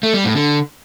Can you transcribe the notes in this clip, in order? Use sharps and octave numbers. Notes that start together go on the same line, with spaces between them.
A3
G3
A2
D3